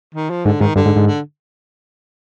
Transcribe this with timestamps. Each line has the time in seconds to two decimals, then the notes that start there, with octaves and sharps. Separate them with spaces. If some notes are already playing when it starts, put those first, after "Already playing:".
0.15 D#3
0.30 F3
0.45 G#2 D3
0.61 G#2 D#3
0.76 G2 D3
0.86 G#2
0.96 G#2
1.07 D3